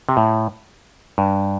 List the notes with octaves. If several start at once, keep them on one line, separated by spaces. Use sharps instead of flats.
C3
A2
G2